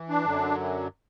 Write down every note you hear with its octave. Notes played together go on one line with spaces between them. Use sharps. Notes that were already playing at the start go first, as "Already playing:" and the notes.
Already playing: E3
D4
F#2 D3 F#3